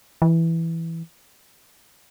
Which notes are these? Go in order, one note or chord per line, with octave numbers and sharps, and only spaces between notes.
E3